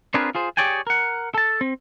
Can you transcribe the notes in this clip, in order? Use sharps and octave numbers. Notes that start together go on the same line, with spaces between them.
C4 D4 F4 G#4 A#4 B4
F4 G#4 C5
G4 G#4 C#5 D5 G5 G#5
A#4 F#5
A4 A5
C4